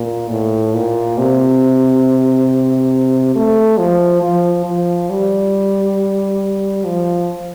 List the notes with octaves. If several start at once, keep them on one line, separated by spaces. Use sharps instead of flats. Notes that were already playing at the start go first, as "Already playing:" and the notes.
Already playing: A#2
A2
A#2
C3
A3
F3
F3
F3
G3
F3